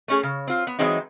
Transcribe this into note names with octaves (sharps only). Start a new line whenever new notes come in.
A3 C#4 G#4
C#3
C4 F4
B3
E3 F#3 G#3 C4 D#4